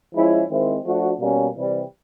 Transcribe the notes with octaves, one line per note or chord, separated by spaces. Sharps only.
F3 G#3 C#4 E4
D#3 G#3 C4 E4
F3 A3 D4 F#4
B2 G3 A#3 C#4
C3 E3 G3